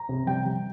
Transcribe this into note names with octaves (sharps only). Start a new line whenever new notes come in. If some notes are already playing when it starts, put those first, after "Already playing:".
Already playing: A#5
C3
G3 G5
G3